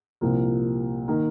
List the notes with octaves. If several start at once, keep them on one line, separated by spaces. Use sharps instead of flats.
C2 A#2 F3 A#3
D#3 A#3